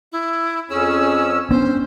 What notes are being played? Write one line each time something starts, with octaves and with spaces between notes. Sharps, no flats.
E4
F2 C#4 G#4 E6
B3 C#4 D4 C5